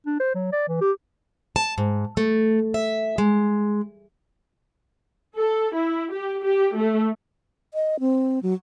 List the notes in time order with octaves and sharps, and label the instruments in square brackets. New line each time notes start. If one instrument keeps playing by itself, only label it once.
[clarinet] D4
C5
F#3
D5
E3
G4
[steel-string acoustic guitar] A5
G#2
A3
E5
G#3
[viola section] A4
E4
G4
G4
A3
[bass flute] D#5
C4
F#3